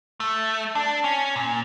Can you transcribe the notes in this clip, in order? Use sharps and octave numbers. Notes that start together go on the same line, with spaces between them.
A3
D4
C#4
A#2